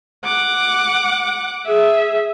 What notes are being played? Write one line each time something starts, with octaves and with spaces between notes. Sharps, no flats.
F#5 D6
G#4 E5